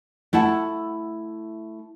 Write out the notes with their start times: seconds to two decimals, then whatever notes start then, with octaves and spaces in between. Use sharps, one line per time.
0.33 A3 E4 F#5 A5